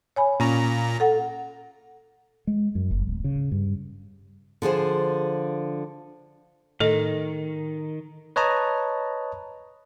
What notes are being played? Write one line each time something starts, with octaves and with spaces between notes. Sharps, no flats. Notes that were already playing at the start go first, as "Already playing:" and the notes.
C#5 G#5 B5
A#2 C#4 A#5
A4 F#5
G#3
F#2
F#1
D1
C#3
G2
D3 F3 G#4 C5
A2 D#3 A4 D#5
B4 C#5 D#5 A5 A#5